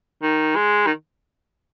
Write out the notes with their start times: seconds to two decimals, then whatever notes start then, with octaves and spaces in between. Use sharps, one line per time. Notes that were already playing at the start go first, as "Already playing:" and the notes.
0.22 D#3
0.56 G#3
0.87 D#3